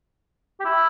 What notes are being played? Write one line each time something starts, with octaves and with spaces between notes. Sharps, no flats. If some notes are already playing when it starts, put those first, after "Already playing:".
G4
E4